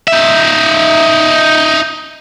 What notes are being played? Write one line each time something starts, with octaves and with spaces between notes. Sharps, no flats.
D#4 E5